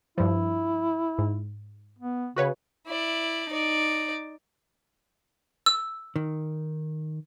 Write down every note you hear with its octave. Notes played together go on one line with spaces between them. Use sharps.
G2 F3 E4
G#2
B3
C#3 F#4 B4 C#5
E4 D5
D#4 D5
E6
D#3